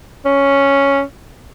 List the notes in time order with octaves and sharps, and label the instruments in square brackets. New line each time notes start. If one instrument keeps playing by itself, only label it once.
[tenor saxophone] C#4